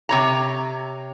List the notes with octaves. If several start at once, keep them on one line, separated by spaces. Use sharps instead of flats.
C3 C#5 A#5